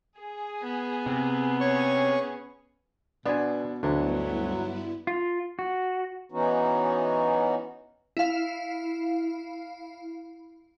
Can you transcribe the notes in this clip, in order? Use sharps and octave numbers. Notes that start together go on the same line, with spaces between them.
G#4
B3
C3
C#4 G#4 C#5 C#6
B2 B3 D4 C5 G#5
D2 G2 D3 F#3 B3 D4 E4
F4
F#4
E3 B3 C#4 D#4 F#4
E4 F5